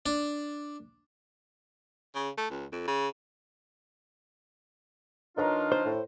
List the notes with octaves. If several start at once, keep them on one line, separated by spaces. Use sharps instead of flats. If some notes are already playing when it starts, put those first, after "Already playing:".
D4
C#3
A3
C#2
F2
C#3
D#3 D4 D#4 F4 B4 C#5 A#5
C5
A2